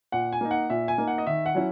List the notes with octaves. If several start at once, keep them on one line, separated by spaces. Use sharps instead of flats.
A#2 F#5
G#5
A#3 D#4
F#5
A#2 E5
G#5
A#3 D#4
F#5
D#5
D#3 E5
F#5
F#3 C#4 E4